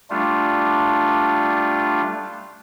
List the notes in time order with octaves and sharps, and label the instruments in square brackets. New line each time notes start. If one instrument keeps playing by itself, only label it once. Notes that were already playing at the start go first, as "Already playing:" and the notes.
[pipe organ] G3 A3 D4 F4